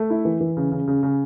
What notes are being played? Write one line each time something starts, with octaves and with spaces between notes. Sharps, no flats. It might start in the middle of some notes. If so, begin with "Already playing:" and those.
Already playing: A3
E4
E3
E3
C#3
C#3
C#3
C#3